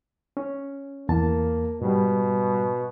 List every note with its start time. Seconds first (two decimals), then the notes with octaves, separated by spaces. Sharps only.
0.37 C#4
1.09 E2 A#3 A5
1.82 G#2 B2 G3